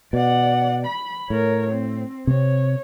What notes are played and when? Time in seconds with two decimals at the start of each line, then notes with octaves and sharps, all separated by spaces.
0.13 B2 D5 F#5
0.86 B5
1.30 A2 A#4 C#5
1.71 C4
2.27 C3 C4 C#5